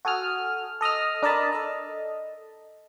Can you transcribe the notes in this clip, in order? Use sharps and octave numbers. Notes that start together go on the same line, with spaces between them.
F#4 A4 G#5 D#6 F6
A4 D#5 D#6 F6
D4 A#4 D#5 A5 B5
A4 D#5